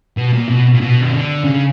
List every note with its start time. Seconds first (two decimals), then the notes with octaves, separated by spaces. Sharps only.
0.17 B2
0.33 A#2
0.49 B2
0.73 A#2
0.81 B2
1.01 D#3
1.13 D3
1.44 C#3